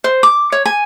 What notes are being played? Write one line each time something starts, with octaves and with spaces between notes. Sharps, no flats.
C5
D6
C#5
G#5